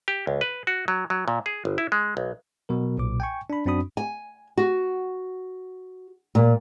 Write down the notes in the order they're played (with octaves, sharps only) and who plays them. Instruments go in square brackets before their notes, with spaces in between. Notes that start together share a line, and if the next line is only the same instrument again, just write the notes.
[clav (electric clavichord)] G4
C#2
B4
F#4
F#3
F#3
A#2
G#4
G1
E4
G#3
B1
[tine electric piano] B2 F#3 A#4
B1 A#2 D6
G5 G#5 C#6
D4 B5
F#2 C4 D4 F#4 B5 D#6
[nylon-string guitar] G#5
F#4
A#2